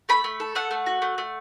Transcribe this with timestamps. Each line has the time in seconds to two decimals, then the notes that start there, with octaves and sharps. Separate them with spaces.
0.09 A3 B5
0.24 A3
0.40 A4
0.55 A3 F#5
0.71 A3
0.86 F#4
1.02 A3
1.18 A3